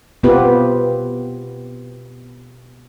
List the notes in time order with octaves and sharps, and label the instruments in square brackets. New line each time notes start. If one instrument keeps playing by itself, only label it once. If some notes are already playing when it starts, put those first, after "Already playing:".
[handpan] B2 B3 C4 F4 G4 B4